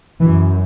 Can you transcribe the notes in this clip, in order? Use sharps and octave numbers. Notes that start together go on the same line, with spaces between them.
F#2 E3